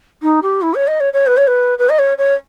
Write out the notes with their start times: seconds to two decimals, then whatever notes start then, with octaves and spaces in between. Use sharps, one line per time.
0.22 D#4
0.42 G4
0.62 E4
0.74 C#5
0.87 D#5
1.00 C#5
1.13 C#5
1.26 B4
1.37 C#5
1.47 B4
1.78 B4
1.89 D#5
1.98 C#5
2.18 C#5